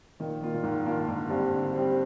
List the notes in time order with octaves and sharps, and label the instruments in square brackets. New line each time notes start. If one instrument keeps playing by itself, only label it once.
[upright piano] A#2 [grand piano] D#3
[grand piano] A#3 F4
[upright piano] A#2
[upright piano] G#2 [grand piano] D#3
[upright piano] G2 [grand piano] A#3 F4
[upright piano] G#2 [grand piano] D3
[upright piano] G2 [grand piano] G3 C4 G4
[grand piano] D3
G3 C4 G4